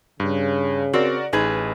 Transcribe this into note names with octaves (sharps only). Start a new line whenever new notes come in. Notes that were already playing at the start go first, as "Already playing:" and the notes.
G2 C#3
C4 F#4 A#4 D5
A1 D#4 G#4 B4